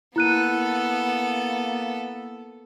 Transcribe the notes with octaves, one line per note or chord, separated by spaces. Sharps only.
A#3 B3 E4 A4 F#6 D#7